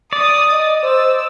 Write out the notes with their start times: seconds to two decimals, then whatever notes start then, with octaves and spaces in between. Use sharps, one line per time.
0.13 D5 D#6
0.51 D#5
0.83 C5 E6